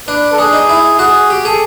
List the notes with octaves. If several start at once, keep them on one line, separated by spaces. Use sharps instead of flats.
D4 B4
A4
D4 G#4
D#4
E4
F#4 G#4
G4
G#4 A4